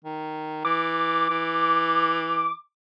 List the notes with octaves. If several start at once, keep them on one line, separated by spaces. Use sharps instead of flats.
D#3
E3 D6
E3